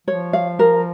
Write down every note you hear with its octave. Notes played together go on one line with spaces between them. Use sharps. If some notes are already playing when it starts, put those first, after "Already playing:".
F3 C#5
F5
A#4